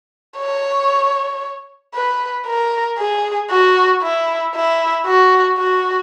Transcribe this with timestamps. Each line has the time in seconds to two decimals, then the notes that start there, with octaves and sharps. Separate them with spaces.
0.38 C#5
1.94 B4
2.47 A#4
2.99 G#4
3.50 F#4
4.03 E4
4.55 E4
5.06 F#4
5.58 F#4